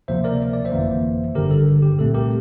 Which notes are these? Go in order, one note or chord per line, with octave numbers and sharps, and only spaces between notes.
D2 C3 F3 A#3 C5 E5
A#4 D5
E5
D5
C5 E5
G1 F2 E3 A#3
G1 G2 D3 G4 A#4
A4
G4
C2 A#2 A3 C4 A4
G4 A#4